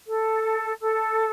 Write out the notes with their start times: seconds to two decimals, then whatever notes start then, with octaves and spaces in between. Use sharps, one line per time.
0.06 A4
0.80 A4